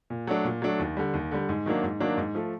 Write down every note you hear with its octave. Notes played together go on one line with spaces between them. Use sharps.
A#2
F#3 A3 D4
A#2
F#3 A3 D4
D#2
D3 G3
D#2
D3 G3
G#2
D#3 F#3 A#3 D4
G#2
D#3 F#3 A#3 D4
G#2
F3 A3